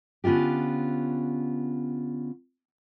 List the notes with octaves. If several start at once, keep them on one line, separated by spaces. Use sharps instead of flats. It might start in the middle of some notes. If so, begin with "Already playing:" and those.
D3 B3 C#4 F4 G4